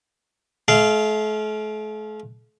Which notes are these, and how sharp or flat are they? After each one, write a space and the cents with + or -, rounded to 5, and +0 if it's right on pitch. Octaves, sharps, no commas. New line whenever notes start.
A3 -45 F5 -10